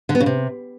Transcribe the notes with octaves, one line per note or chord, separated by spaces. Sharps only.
D3
B3
C#3
C3